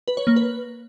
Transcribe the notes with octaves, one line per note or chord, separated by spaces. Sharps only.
B4
C#5
A#3
B4